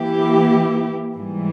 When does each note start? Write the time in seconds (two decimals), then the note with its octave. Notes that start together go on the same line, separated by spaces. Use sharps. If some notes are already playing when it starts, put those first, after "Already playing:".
Already playing: E3 A#3 E4 G4
1.15 G#2 E3 G3